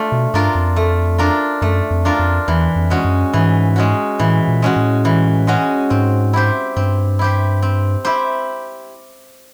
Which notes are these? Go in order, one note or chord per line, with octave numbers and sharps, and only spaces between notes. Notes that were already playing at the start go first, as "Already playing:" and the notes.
Already playing: A3 D4 F4
B2
G2 D4 F4 A#4
F2
A3
D4 F4 A#4
F#2 A3
F2
D4 F4 A#4
F2
E2 E3
F2
G#3 C#4 F#4
F#2
G#2 E3
G#3 C#4 F#4
A2 E3
A#2
G#3 C#4 F#4
A2
E3
G#3 C#4 F#4
G#2 C4
E4 G4 C5
G2 C4
E4 G4 C5
C4
E4 G4 C5